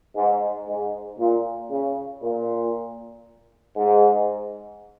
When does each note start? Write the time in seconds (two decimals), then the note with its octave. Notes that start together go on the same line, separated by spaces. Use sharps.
0.16 G#2
0.67 G#2
1.19 A#2
1.70 C#3
2.23 A#2
3.76 G#2